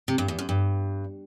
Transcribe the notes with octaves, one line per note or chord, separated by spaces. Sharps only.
C3
G2
E2
F#2
G2